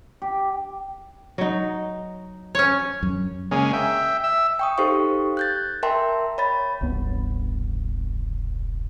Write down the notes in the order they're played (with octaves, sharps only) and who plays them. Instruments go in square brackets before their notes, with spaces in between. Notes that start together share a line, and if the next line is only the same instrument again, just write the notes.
[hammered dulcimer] G4
[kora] F#3 D#4
[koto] C#4 C#5
[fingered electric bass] F#2
[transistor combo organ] C#3 G#3 A#3 C#4
E5 G5
E5 E6
[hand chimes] G5 C#6 D#6
D#4 G4 A4 C5 F5 C#6
F#6 G6 A6
A#4 E5 G5 A5 C6
C#5 B5 A6
[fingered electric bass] E1 C2 G2 B3